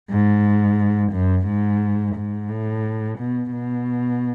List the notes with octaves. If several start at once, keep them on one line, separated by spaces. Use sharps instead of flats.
G#2
F#2
G#2
G#2
A2
B2
B2